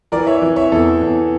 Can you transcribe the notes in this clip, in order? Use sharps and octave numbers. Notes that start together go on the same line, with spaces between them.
E3 A#4 D5
C#5 E5
E3
C#5 E5
E2 A4
E2